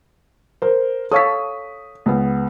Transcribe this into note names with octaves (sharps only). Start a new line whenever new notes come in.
A#4 C5
A4 C#5 F5 D#6 B6
C#2 B3